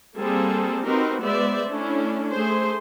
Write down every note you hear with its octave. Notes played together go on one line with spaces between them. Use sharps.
G3 A#3 C4 G#4 A4
C4 D#4 F#4 G4 A#4 B4
G#3 B3 C5 D5 E5
A3 C#4 D4 E4
A3 G#4 C5